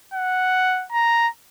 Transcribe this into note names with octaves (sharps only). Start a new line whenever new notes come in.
F#5
A#5